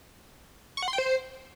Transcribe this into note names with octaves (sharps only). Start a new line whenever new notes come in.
C#6
F#5
C6
G5
C5